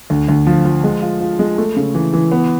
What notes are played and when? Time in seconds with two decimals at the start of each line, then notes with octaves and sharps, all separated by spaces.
0.10 D2
0.29 D2
0.47 F3
0.65 F3
0.84 G#3
1.02 F4
1.21 F4
1.39 G#3
1.58 A3
1.76 C#3
1.95 E3
2.14 E3
2.31 B3